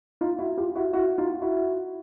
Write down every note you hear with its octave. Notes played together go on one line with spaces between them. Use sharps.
D#4 F4
E4 F#4
F4 G4
E4 F#4
E4 F#4
D#4 F4
E4 F#4